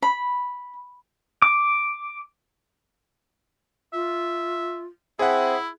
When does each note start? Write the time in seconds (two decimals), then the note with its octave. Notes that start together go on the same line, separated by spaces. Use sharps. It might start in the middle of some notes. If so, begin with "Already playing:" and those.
0.02 B5
1.42 D6
3.93 F4 E5
5.19 C4 E4 G#4 E5 F#5